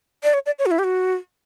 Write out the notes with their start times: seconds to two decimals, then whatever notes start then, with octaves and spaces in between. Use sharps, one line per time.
0.24 D5
0.34 C#5
0.46 D5
0.59 C#5
0.66 F#4
0.71 E4
0.79 G4
0.84 F#4